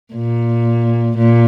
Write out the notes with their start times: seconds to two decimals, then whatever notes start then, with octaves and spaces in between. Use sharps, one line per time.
0.14 A#2
1.17 A#2